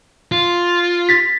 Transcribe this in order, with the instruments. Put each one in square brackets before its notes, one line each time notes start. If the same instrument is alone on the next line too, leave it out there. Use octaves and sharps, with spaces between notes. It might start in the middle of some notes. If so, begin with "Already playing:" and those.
[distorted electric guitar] F4
[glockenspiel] A6 B6